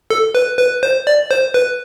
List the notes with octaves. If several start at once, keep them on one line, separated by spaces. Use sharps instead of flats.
A4
B4
B4
C5
D5
C5
B4